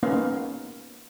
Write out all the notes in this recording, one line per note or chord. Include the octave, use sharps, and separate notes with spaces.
A#3 B3 C#4 D#4 F5